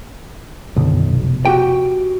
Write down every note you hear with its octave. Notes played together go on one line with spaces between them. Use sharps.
B1 F#2 D3 D#3
F1 B2
F#4 G4 G5